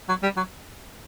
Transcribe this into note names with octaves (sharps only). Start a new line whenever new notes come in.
F#3
G3
F#3